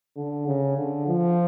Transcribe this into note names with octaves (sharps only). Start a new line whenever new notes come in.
D3
C#3
D3
F3